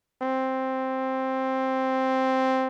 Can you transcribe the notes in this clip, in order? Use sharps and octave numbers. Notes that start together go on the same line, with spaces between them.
C4